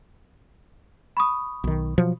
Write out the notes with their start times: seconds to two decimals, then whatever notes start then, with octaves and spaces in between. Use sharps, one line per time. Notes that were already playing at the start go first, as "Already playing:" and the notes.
1.17 B5 C#6 D#6
1.64 B1 D#3
1.98 B2 F3 F#3